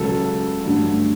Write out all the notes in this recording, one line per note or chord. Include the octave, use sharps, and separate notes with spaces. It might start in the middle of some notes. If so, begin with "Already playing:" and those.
Already playing: C#2 C#3 F#3 A4
G2 D3 F#3 A3